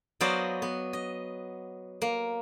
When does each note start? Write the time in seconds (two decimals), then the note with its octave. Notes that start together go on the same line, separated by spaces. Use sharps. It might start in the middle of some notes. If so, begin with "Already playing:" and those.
0.21 F#3 B3 C5 D5 D#5 F5
0.62 B3
0.93 D#5
2.02 A#3